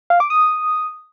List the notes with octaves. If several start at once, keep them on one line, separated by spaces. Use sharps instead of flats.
F5
D6
D#6